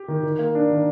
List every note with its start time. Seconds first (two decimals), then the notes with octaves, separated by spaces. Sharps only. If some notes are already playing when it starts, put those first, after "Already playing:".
Already playing: G4
0.08 D#3
0.23 D#3
0.39 A#3
0.55 D4
0.70 D#3